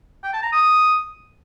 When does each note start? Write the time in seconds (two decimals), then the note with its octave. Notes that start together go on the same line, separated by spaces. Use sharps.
0.24 G5
0.33 A5
0.43 A#5
0.52 D#6